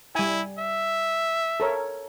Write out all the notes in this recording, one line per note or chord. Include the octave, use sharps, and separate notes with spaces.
G3 E4 G#5
E5
A4 A#4 C#5